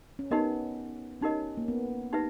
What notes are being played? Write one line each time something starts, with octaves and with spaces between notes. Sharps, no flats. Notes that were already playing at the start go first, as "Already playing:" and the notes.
C#4
B3 D#4 G4 A#4 D#5
C#4 D#4 G4 A#4 D#5
A#3
B3
D#4 G4 B4 E5